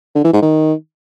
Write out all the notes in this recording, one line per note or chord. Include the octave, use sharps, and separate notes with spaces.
D3
E3
G#2
D#3